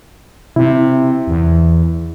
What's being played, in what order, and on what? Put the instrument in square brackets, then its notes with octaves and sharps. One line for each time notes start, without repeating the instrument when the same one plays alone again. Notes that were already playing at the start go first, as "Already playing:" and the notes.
[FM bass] C3 [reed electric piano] E4
[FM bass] E2